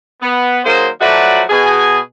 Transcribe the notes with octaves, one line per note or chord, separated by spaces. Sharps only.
B3
D#3 F#3 A#3 G#4 C5
F3 F#3 A3 F#4 B4 D5
B2 G#4 G#5